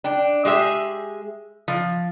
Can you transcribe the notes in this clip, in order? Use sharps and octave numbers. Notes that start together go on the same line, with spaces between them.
D4 G5
G#3 G4 G#4 E5
F3